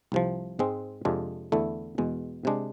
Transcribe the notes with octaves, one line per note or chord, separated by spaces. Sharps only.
C2 C3 F3
G#2 G#3 C4
F2 C3 F3 G#3 D4
E2 D3 A3 E4
E2 B2 G#3
C3 G#3 D4